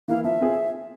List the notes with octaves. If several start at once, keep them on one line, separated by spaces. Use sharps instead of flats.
E3 A#3 E4 F5
F3 E5
C4 F4 G#4